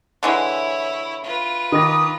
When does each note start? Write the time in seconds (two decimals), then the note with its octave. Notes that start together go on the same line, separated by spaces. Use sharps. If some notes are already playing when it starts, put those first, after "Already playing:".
0.23 D3 E3 G#3 E4 C#5
1.24 F4 B4
1.72 D#3 D#5 A#5 D6 D#6 A#6